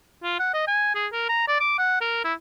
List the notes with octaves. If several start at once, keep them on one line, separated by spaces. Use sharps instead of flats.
F4
F#5
D#5
G#5
G#4
A#4
A#5
D5
D6
F#5
A#4
E4